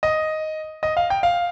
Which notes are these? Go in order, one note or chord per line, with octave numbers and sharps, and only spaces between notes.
D#5
D#5
F5
G5
F5